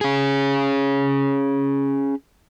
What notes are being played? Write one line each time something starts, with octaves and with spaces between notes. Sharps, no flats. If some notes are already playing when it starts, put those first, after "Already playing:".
C#4 G#4